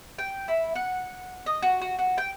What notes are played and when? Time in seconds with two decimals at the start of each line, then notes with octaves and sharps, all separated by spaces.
0.18 G5
0.48 E4
0.75 F#5
1.46 D#5
1.62 F#4
1.82 F#4
1.99 F#4
2.18 G5